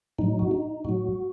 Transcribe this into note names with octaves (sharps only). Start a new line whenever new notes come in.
A2 F#3 D#4
F#4
D#4
A2 F#3 F#4